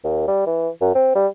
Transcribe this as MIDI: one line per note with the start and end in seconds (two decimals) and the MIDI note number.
0.04 0.24 39
0.28 0.46 55
0.46 0.69 52
0.81 0.93 42
0.95 1.11 60
1.15 1.27 55